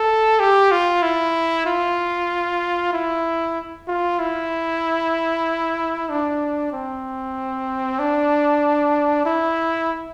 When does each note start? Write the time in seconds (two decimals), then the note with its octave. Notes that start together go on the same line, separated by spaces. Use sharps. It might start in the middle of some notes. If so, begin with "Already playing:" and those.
Already playing: A4
0.40 G4
0.72 F4
1.03 E4
1.66 F4
2.93 E4
3.88 F4
4.19 E4
6.10 D4
6.72 C4
7.99 D4
9.26 E4